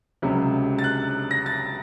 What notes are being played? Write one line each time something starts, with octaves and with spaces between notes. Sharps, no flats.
C#2 C3 F#3
A6
F#6
A#6
A6